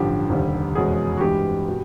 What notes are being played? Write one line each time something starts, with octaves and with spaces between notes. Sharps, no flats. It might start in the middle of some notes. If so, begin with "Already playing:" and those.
Already playing: A1 G2 D3 F3 G4
F1 D#2 D3 G3
F1 E2 B2 G#3 C#4 G#4
F#4
G2 E3 G#3 G4
B2